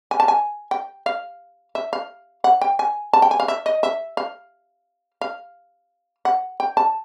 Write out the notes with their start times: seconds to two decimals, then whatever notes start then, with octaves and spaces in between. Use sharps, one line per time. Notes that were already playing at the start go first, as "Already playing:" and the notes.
0.11 G#5
0.20 A5
0.28 G#5
0.71 G5
1.06 F5
1.75 E5
1.93 F5
2.44 F#5
2.61 G5
2.79 G#5
3.13 A5
3.22 G5
3.31 G#5
3.40 F5
3.48 E5
3.66 D#5
3.83 E5
4.17 F5
5.21 F5
6.25 F#5
6.60 G5
6.77 A5